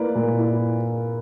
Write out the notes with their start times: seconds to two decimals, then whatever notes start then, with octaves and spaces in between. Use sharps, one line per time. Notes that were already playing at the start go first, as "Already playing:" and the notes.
Already playing: A#3 E4 B4 D5
0.15 A#2
0.39 E4